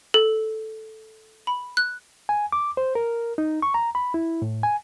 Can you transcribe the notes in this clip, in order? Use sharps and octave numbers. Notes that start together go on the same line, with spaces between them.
A4
B5
F#6
G#5
D6
C5
A#4
D#4
C#6
A#5
B5
E4
A2
G#5